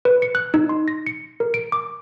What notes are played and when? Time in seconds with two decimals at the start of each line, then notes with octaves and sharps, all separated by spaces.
0.05 B4
0.22 C#7
0.35 F#6
0.54 D#4
0.69 C6
0.88 A#6
1.07 C#7
1.40 A#4
1.54 D7
1.72 D6